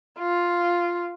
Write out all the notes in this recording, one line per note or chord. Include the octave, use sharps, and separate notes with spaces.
F4